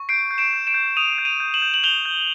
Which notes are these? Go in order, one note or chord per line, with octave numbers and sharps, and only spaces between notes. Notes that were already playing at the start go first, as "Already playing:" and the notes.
Already playing: C#6
G6 C7 D7
G6
D7 E7
G6
D7 E7
G6
D#6 D#7 F7
G6
D#7 F7
G6
E7 F#7
G6
F#7
G6 F7 G7
G6